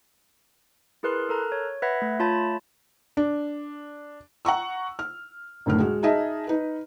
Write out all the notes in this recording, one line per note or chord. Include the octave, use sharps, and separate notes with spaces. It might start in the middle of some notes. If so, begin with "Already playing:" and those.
E4 G#4 A#4 B4 C6 F#6
A4 A#4 A#5 F#6
C#5
B4 E5 F#5 B5 G#6 A#6
A3
A3 F4 C#5 A5 B5 A6
D4
F#5 A#5 C#6 E6
F6
F#1 D2 A2 F6
G#3 F#4
D#4 G#4 D#5 E5 A5
D#4 B4